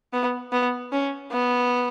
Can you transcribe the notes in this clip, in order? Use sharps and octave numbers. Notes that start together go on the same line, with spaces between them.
B3
B3
C#4
B3